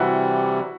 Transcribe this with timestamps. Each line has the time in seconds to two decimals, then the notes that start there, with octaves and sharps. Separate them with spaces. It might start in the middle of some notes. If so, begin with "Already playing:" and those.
Already playing: C3 E3 G3 E4 F#4